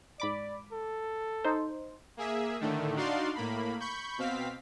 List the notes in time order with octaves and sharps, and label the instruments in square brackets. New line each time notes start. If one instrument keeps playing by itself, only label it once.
[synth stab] G#2 B5 D6 [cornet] D5
[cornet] A4
[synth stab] D#4 C5
[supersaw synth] A#3 G#4 E5
A2 D3 D#3 A3
D4 D#4 F#4 D5 F5 C6
A2 A#3 B5
B5 C#6 G6
B2 C4 F5 B6